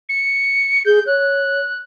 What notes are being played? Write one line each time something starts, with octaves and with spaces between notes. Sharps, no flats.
C#7
G#4 G6
C#5 F#6